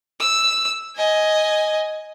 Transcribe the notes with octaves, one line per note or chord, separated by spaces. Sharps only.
E6
D#5 G#5